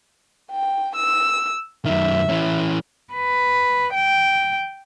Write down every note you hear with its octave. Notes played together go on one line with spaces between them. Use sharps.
G5
E6
F#2 D#3 E5
E3 C#4
B4
G5